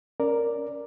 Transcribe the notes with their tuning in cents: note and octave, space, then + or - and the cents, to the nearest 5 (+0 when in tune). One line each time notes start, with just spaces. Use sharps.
C#4 +0 A#4 +0 D5 +0